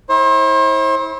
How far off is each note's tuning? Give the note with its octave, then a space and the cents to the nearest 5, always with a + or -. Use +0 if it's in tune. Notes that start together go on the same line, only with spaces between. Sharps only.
E4 -30 C5 +40